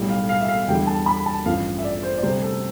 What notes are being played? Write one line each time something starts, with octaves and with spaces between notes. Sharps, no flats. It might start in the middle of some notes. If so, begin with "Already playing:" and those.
Already playing: B1 A2 G3
F5
F5
E5
F5
E2 D3 G3 G5
A5
B5
A5
A1 G2 F3 F5
E5
D5
C5
D5
D2 C3 G3 C5
A4